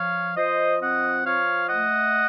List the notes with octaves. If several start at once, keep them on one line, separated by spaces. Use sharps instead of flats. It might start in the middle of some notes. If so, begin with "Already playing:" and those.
Already playing: F3 C#5 F5
F3 C5 D#5
C4 D#5 F#5
F3 C#5 F5
A3 D#5 F#5